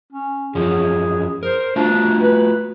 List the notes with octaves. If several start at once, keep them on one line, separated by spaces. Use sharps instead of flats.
C#4
F#2 F3 C#4 G#4
A#4 C5
A3 D4 F4 F#4
B4